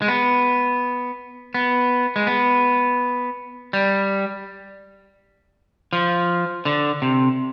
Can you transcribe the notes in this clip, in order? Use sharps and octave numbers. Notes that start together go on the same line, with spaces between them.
G#3
B3
B3
G#3
B3
G3
F3
D3
C3